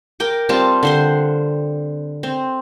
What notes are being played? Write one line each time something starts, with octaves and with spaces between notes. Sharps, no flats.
A#4 G5 D6
G3 C4 F4 A5
D3 C5 C6
C4